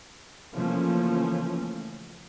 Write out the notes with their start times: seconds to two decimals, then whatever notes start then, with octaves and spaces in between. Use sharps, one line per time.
0.54 C#3 E3 F3 A3 A#3 C#4